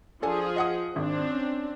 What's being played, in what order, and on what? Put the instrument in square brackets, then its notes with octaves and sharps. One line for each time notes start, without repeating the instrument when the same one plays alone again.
[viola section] F3 G#4 [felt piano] D4 A4 G#5
[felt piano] D#5 F#5 D#6
[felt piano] G#1 [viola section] C4 D4
[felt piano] C#4